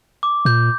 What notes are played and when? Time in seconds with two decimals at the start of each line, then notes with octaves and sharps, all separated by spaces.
0.23 D6
0.45 A#2 G6